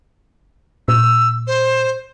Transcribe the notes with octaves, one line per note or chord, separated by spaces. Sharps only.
A#2 E6
C5